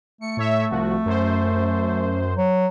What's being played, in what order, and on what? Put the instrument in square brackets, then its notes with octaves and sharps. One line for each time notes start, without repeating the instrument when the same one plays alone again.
[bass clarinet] A3 [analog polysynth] C#7
[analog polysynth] A2 C#5 E5
C2 F3 F#4
F#2 C5
[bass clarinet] F#3